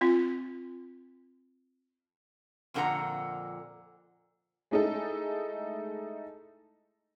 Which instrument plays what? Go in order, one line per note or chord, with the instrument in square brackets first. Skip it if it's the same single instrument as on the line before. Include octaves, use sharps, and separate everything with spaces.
[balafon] C4 F4
[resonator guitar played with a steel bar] F2 A#2 D3 F#4 F#5 A#5
[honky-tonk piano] G#3 A3 D#4 E4 A4